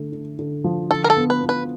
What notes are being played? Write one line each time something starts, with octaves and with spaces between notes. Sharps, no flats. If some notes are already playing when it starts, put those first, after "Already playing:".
Already playing: D3 A3
D3
D3
F3
D3 A4
A#4
A4
B3
B4
B3
B4